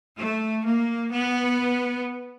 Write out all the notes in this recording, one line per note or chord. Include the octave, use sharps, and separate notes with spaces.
A3
A#3
B3